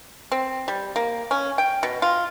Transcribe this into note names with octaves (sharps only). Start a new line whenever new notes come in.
C4
G3
A#3
C#4
G5
B2
F4